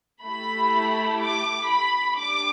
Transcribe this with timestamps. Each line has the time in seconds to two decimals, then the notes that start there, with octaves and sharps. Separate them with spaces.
0.24 A3 E4 G4 B5
1.21 D6
1.69 B5
2.18 D4 G4 D6